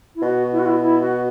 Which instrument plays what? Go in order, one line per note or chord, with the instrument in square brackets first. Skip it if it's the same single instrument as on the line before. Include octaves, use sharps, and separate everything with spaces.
[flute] E4
[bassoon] B2 [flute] F#4
[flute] E4
F#4
E4
E4
F#4